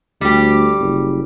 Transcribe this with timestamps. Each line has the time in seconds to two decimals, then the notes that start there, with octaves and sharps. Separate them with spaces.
0.21 D2 G3 G4
0.80 F#1